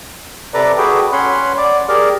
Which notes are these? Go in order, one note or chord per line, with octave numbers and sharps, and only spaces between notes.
C3 A4 B4 D5 A#5 D6
F#4 G#4 A4 B4 G5 D6
C#4 C#5 F#5 B5 C6
D5 D6
G4 G#4 A#4 D5 D6 F6